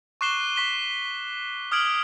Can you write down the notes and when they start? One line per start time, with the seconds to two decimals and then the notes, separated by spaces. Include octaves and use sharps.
0.21 C#6 D6 F#6 C7 E7 G7
0.56 C#6 B6 G7
1.72 D#6 F6 G#6 D7 F#7